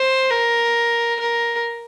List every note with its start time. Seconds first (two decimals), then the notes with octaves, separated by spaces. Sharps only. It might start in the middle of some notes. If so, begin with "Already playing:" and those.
Already playing: C5
0.31 A#4
1.19 A#4